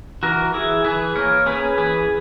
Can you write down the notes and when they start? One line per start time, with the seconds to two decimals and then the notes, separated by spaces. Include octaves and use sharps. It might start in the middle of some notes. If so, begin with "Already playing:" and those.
0.23 E3 F#4 A#4
0.54 E3 E4 G#4
0.85 E3 G#4 B4
1.15 A#3 A#4 C#5
1.46 C#4 G#4 B4
1.77 E3 G#4 B4